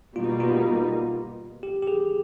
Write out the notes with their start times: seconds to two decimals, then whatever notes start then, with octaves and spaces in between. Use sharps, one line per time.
0.16 B2 G3 A#3 D#4 F4
0.40 F4
1.63 G4
1.82 G4
1.87 G#4